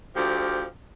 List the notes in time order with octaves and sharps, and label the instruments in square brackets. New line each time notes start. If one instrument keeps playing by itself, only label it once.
[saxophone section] D2 F3 G4